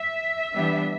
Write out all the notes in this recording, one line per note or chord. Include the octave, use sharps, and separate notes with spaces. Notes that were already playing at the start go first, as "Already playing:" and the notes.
Already playing: E5
E3 G3 B3 D4